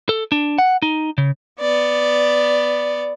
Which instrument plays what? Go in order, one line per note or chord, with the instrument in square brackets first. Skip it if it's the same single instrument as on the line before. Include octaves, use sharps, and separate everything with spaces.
[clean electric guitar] A4
D4
F#5
D#4
C#3
[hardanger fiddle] B3 D5